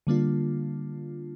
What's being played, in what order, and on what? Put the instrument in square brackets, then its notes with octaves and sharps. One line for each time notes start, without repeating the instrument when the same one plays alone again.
[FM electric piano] D3 G3 A#3 D4 F4